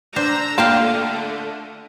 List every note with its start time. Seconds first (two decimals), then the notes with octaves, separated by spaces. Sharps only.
0.16 D4 C5 A#5 E6
0.58 D3 A3 A#3 D4 F4 F5 G5 A5